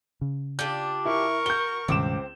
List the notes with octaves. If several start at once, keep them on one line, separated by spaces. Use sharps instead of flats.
C#3
D4 F4 G4 G6
E4 A#4 C#6
F#4 G6 G7
C#2 G2 B2 D#3 C4 D6 E7